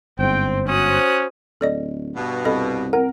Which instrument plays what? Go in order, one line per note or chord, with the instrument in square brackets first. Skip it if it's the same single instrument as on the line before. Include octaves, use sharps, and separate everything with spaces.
[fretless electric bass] G1 G#2 [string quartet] C4 [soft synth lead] C5 [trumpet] G5
[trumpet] C#4 [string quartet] F#4 D#6 F#6
[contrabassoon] D1 [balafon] A4 D5 D#5
[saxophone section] G2 B2
[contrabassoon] C2 [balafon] A4 D#5 B5
[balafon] C4 F#5 [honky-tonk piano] A#4